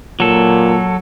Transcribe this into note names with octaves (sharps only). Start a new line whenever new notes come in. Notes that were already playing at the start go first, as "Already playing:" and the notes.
A#2 F#3 A4